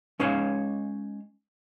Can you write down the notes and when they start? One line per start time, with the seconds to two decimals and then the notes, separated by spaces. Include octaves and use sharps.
0.20 G#3 C#4 D#4 C#5 F5